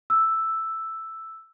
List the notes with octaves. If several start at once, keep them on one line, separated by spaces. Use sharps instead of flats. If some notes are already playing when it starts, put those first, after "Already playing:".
E6